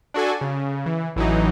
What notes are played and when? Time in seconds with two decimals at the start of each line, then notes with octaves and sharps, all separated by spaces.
0.14 D4 F#4 A4 G#5
0.41 C#3
0.86 E3
1.16 A1 E3 F#3 D#4